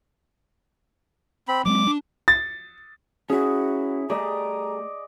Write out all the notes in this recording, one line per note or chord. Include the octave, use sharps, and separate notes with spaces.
C4 B5
F#3 G#3 C4 D6
D4
A6
C#4 E4 F#4 G#4
A3 G4 G#4 D5 D#5 A#5